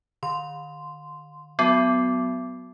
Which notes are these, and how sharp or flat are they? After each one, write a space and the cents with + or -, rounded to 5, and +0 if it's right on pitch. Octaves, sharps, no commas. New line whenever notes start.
D#3 -40 C6 -10
F#3 +0 B3 +20 F#4 +0